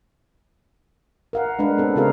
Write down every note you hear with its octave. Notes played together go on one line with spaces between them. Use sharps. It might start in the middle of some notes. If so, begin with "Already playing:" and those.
A#4 F5 F#5
G#3 D4 A4 B4 D5 F5
B3 C4 A4
C#3 C4 F#4 G#4 A#4 F5